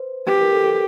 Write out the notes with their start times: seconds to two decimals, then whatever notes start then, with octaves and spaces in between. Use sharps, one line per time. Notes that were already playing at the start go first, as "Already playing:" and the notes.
Already playing: B4 C5
0.27 G4 B4
0.40 A#4
0.52 A4
0.65 A4